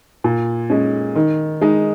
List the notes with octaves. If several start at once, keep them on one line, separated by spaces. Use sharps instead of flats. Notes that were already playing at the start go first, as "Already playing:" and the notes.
A#2
G#3 C#4
D#3
G#3 D#4